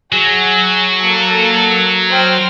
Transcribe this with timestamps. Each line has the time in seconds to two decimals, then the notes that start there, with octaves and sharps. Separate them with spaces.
0.12 F#3 G#4
1.03 A#3 A4
2.11 C5 G5 F6